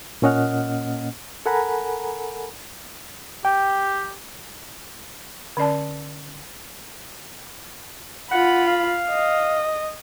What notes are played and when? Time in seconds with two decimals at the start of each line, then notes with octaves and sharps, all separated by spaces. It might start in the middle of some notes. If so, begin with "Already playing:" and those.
0.22 A#2 A#3 C#4 D#5 F#5 F6
1.46 A4 A#4 F#5 G#5 A#5 B5
3.45 G4 G5
5.57 D3 C#4 D5 A5
8.31 F4 F#5 B5
8.68 F5
9.10 D#5